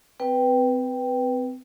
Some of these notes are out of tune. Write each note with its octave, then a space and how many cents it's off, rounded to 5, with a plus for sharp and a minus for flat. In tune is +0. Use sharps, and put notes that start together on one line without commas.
C4 -30 B4 +0 G5 +0